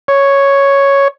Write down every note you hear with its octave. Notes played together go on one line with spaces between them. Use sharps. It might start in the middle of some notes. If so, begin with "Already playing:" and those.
C#5